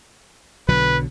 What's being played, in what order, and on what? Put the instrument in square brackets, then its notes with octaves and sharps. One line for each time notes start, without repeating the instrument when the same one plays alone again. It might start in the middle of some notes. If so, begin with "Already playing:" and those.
[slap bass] B1 D3 F#3 [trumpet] B4